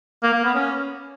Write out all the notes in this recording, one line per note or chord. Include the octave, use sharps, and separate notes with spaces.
A#3
A#3
B3
C#4